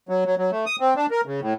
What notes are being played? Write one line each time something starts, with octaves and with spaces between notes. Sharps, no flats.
F#3
F#3
F#3
A3
D#6
C4
D4
A#4
C#3
A2